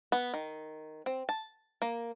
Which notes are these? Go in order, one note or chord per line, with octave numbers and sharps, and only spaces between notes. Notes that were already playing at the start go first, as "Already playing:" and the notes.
B3
D#3
C4
A5
A#3